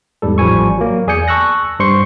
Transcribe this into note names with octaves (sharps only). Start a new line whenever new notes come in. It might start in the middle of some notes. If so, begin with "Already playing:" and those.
E2 G#2 G3 A4
A1 F3 G3 G#5 C#6
F#3 A#3
E2 G#4 D5 G#5 G6 C#7
A5 C#6 E6 F#6 A#6
G2 G3 C5 C6 C#6 C#7